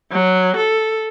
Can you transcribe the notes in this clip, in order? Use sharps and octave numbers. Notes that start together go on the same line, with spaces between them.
F#3
A4